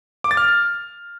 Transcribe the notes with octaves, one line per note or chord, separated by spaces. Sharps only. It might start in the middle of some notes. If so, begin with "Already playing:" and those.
D6
A6
F6